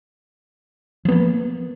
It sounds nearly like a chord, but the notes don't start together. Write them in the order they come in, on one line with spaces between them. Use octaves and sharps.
F3 B3 A#3